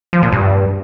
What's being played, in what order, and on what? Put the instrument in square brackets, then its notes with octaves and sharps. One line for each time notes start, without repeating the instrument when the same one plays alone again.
[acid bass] F3
A#2
G2